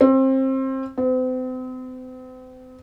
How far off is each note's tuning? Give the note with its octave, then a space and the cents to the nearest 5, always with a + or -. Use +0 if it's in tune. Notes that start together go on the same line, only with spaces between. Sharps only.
C4 +25
C4 -40